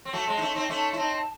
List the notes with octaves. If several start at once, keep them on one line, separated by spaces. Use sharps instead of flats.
C4
F#3 A3 A5
G#3 C4
D#4
A3 C#4
C4 D#4
A3 C#4
E4
C4 D#4